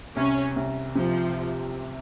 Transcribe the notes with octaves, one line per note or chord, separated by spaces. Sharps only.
C2 C#4
C2
C3 F3